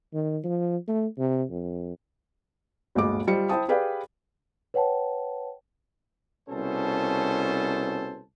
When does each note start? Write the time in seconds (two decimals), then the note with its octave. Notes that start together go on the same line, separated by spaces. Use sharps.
0.14 D#3
0.44 F3
0.88 A3
1.18 C3
1.50 F2
2.95 G1 D2 A#2 G#3 D#5 D6
3.27 G3 F4 C5 D#5 C#7
3.49 E4 C5 G5 A5 D#6
3.68 G4 G#4 B4 D5 F5 G5
4.74 B4 C#5 F#5 G5 A5
6.49 C2 B2 C#4 A4 C5 A5